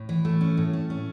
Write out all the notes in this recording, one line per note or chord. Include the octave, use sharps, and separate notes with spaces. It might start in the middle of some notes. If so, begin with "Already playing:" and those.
Already playing: A2
E3
A3
C#4
A2
A3
C#4